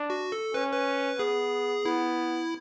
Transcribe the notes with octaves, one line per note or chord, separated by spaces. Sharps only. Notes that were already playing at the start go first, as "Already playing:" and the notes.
Already playing: D4
F#4
A4
C#4 B4
B4
B3 G#4
B3 E4